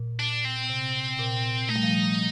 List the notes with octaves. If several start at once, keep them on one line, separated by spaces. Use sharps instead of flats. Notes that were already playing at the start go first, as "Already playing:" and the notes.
Already playing: A#2
D4
C4
C3
A#2
A3 D#4
G3
F3
G3